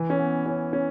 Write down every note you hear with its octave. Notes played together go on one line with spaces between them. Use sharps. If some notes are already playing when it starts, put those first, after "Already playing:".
Already playing: E3
C#4
B3
C#4
C#4